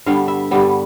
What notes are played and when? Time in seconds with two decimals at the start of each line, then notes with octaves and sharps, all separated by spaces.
0.06 G2 D3 G3 B3 F5
0.28 E5
0.51 G2 D3 G3 B3